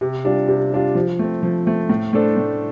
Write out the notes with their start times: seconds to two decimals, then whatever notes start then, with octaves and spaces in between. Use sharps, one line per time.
0.01 C3
0.24 G3 D4 F4
0.48 C3
0.72 G3 D4 F4
0.95 F3
1.19 A3 C4
1.43 F3
1.66 A3 C4
1.89 A2
2.13 A3 D4 A4 C5
2.37 A2